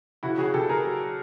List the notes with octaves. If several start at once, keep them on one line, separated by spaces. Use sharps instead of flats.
C#3 E4 F#4
C#3 F#4 G#4
C#3 G4 A4
C#3 G#4 A#4
F#3
F#3